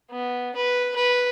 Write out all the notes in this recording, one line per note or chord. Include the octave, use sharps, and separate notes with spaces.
B3
B4
B4